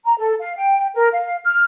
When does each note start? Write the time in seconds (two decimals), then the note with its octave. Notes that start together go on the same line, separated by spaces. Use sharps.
0.05 A#5
0.19 A4
0.40 F5
0.57 G5
0.94 A#4
1.13 F5
1.45 F6